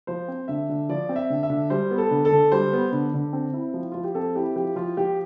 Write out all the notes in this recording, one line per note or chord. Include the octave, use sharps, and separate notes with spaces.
F3 C5
C4
D3 E5
D3
F3 D5
C4
E5
D3
E5
D3
G3 C5
B3
A4
D3
A4
D3
G3 C5
B3
D3
D3
C4
E4
F3
F3 F4
G4
C4 A4
E4 G4
F3 G4
F3 F4
F3 G4